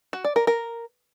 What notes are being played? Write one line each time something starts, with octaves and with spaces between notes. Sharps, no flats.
F#4
D5
A#4
A#4